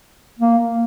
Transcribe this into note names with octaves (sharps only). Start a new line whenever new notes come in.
A#3